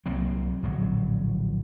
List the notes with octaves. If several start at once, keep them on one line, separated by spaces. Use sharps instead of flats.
C2 F#3 A#3 C4
D1 A#1 F#3